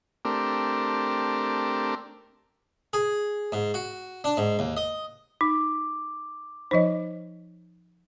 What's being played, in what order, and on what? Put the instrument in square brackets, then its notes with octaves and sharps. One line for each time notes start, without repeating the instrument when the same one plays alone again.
[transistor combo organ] A3 C4 D4 G4 A#4
[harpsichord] G#4
G#2
F#4
D4
G#2
D#2
D#5
[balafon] D#4 [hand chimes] D6
[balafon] F3 D#4 [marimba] C5 D#5